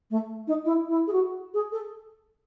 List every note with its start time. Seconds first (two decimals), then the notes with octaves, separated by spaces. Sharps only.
0.10 A3
0.47 D#4
0.64 E4
0.88 E4
1.07 G#4
1.12 F#4
1.54 G#4
1.72 A4